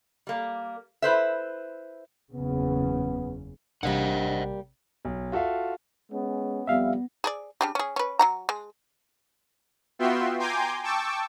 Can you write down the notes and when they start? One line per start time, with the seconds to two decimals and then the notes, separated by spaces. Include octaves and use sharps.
0.27 G3 A#3
1.02 E4 B4 C5 E5
2.33 F#1 E2 C#3 B3
3.83 A1 C3 G3 A#3 D4 C5 D#5 F#5
5.05 B1
5.32 F4 F#4 A4 E5 F5
6.10 G#3 B3 C#4
6.67 F2 G3 B3 E5 F5
7.24 G#4 A#4 D5
7.61 C#3 D4 G4
7.75 C#4 G#4
7.96 C#4 B4
8.19 F#3 F#5 A#5
8.49 G#3
9.99 B3 F4 F#4 E5 G5 C6
10.39 G5 G#5 A#5 C6 D6 G6
10.83 G5 A5 C#6 D6 E6